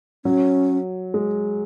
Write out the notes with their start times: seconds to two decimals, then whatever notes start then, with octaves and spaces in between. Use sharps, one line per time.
0.25 F#3 C#4
1.14 G#3